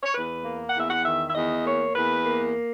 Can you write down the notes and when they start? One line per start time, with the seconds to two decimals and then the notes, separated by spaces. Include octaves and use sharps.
0.03 C#5
0.14 E2 B4
0.45 A#3
0.70 F#5
0.75 E2 E5
0.90 F#5
1.05 D#3 E5
1.29 E5
1.35 E2 D#5
1.65 A#3 C#5
1.95 E2 B4
2.25 A#3